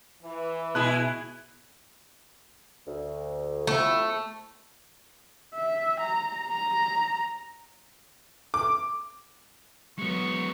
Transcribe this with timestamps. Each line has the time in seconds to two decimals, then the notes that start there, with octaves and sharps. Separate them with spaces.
0.22 E3
0.75 B2 G#3 E4 F#6
2.86 D2
3.67 F3 A3 C4 E4
5.55 E5
6.00 A#5
6.48 A#5
8.54 D6
9.98 F#3 G#3 B3 C#6